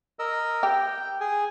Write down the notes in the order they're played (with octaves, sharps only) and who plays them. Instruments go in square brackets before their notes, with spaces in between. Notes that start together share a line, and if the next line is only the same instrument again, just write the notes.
[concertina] A#4 D#5 E6
[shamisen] G4 [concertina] G5
[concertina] G#4 G#5